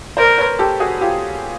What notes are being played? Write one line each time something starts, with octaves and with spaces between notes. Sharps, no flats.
A#4 C5 D5
B4 C#5
G4 A4
F#4 G#4
F4 G4